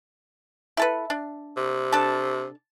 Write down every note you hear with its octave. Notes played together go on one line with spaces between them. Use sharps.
E4 A4 B4
D4
C3
D4 A4 A5